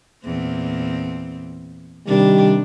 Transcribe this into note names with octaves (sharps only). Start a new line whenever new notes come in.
E2 A#2 C4
C3 D#3 G3 D4